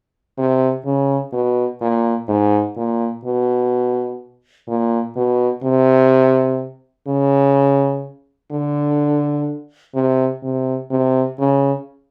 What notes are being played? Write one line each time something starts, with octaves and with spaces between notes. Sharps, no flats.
C3
C#3
B2
A#2
G#2
A#2
B2
A#2
B2
C3
C#3
D3
C3
C3
C3
C#3